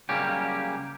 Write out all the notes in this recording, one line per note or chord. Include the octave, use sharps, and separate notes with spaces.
C#3 F#3 G3 A#3 C#4 G4